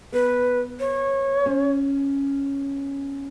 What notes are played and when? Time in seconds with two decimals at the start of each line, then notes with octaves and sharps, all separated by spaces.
0.12 B3 B4
0.80 C#5
1.46 C#4